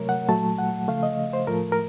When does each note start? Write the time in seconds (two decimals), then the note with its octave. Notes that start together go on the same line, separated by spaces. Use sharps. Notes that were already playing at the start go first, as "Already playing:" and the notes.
Already playing: C3 F#3 A3 A#4 C#5
0.09 F#5
0.28 A#2 F#3 A3 A5
0.59 F#5
0.88 C#3 F3 A3 F5
1.03 D#5
1.33 C5
1.47 A2 F3 A3 A#4
1.72 A#4